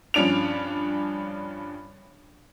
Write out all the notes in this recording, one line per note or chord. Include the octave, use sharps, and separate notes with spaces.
G2 F3 C#4 D4 D7 F7